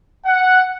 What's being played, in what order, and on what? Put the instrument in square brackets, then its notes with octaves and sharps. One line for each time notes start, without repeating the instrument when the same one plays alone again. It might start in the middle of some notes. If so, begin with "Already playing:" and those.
[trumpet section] F#5